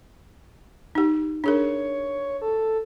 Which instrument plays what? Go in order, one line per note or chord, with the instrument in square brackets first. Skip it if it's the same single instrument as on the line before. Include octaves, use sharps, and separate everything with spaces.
[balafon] D#4 G4
[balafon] D4 G#4 A#4 [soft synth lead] C#5
[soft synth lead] A4